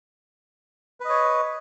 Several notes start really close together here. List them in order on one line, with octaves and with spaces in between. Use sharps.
B4 D#5 C#5